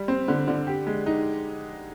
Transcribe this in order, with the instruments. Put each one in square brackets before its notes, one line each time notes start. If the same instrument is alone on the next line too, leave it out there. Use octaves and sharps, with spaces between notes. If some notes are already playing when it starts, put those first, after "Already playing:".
Already playing: [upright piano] G3
C4
D3
D3
G4
G#3
D#4